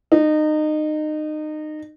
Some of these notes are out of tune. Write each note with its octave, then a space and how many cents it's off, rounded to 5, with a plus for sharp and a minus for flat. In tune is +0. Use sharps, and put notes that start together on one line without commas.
D#4 -25